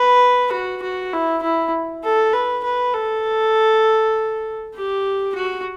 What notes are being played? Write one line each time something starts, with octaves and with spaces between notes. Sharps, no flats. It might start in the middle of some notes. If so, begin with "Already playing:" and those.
Already playing: B4
F#4
F#4
E4
E4
A4
B4
B4
A4
G4
F#4